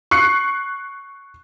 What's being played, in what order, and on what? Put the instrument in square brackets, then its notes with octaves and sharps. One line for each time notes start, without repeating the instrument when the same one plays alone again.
[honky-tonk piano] C#6 F#6 C7 C#7